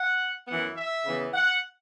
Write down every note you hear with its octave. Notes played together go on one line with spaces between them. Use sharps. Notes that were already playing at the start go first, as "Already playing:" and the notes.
Already playing: F#5
F#2 E3 B3 F#5
E5
C#3 E3 B3
F#5